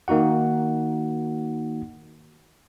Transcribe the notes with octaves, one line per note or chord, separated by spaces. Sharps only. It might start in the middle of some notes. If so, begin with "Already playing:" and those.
D#3 A#3 D#4 F#4 F#5